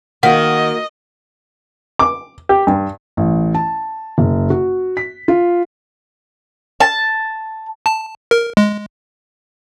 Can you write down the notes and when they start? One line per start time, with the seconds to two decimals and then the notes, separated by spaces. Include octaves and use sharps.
0.23 D#3 A#3 F#4 D#5 F#5
1.99 D6
2.49 G4
2.67 G2
3.17 A1
3.55 A5
4.18 F#1
4.50 F#4
4.97 B6
5.28 F4
6.80 A5
7.86 A5
8.31 A#4
8.57 G#3